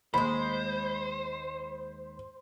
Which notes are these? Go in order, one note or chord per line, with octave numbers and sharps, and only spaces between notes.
D#2 G#3 C5 B5